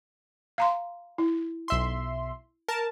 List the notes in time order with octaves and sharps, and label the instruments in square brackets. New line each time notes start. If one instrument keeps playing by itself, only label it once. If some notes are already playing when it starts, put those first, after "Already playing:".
[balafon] F5 A#5 C6
E4
[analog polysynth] B1 E5 C6
A#4 A5